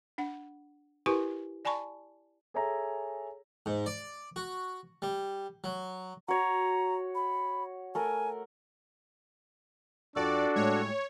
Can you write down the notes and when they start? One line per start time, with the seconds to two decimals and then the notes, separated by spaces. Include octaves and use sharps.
0.18 D4 F#5
1.06 E4 G4 A#4 B4 G#5 C#6
1.65 D5 G#5 A5 B5 C#6
2.54 G#4 A4 C#5 E5 G#5 A#5
3.66 G#2
3.86 D5
4.36 F#4
5.02 G3
5.64 F#3
6.28 F#4 C#5 A#5
7.15 B5
7.95 A3 A#4 G#5
10.16 F2 D4 F#4 A4 D5 A5
10.56 A2 G3 G#3 C#5